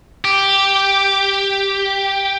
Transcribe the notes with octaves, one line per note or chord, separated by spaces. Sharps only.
G4